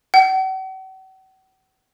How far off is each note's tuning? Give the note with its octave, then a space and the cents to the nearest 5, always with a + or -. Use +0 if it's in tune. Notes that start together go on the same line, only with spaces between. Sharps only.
F#5 +45